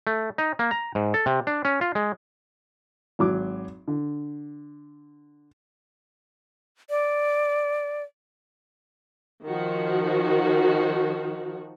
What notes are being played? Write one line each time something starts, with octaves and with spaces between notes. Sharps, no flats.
A3
D#4
A#3
A#5
G#2
A4
C3
D4
C#4
F4
G#3
G#1 F#3 D6
D3
D5
D#3 F3 F#4